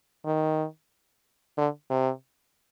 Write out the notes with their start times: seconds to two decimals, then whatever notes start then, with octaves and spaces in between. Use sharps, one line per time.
0.26 D#3
1.58 D3
1.90 C3